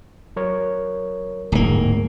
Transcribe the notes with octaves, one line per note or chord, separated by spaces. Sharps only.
F#3 A#4 C#5
D1 F2 G#2 A#3